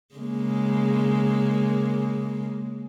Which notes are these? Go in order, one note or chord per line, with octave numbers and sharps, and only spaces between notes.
C#3 G#3 A#3